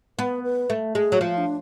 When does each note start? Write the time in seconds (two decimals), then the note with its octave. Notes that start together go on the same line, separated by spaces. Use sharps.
0.19 B3 B4
0.44 B4
0.70 A3
0.95 G#3 G#4
1.12 F#3
1.20 F3 F4
1.38 D4